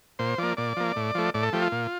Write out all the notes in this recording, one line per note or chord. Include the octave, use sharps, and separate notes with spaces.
A#2 C5
F3 A#3 D5
A#2 D5
F3 A#3
A2
F3 A3
A2 D5
A4
F3 A3 G4
F4
A#2